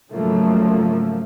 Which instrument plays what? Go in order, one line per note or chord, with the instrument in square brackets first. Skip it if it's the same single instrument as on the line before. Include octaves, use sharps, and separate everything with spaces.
[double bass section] G#2 C#3 F3 F#3 A3 A#3